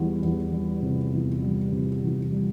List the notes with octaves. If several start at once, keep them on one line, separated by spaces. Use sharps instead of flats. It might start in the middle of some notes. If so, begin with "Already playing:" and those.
Already playing: E2 G3
E2
G3
C3
E2
G3
C3
E2
G3